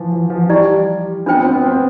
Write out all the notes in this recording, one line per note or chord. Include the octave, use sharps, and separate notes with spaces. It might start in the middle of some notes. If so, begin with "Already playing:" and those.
Already playing: E3 F3 B4
F3
F3
G3 E4 G4 D5
B3 D4 F4 C5 G5
C4
B3
C4